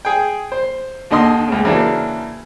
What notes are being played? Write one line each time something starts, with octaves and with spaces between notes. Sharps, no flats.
G#4 G5
C5
D#2 D3 D#5 C6 D#6
C#2 C#3
C#3 E3 F#3 A#3 D4